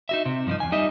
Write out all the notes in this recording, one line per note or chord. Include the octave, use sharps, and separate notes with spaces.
D#4 F#4 E5
C3
G2 F3 D4 D#4
E2 G#5
G3 D#4 D#5 E5